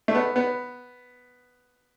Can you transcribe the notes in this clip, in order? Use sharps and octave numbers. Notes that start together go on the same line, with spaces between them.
A3
B3
B3